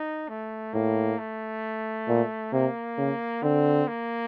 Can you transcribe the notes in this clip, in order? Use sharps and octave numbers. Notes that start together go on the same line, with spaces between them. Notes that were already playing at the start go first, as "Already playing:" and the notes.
Already playing: D#4
A3
A2 A#3
A3
A#2
C3 A#3
C#3
D3 C4
A#3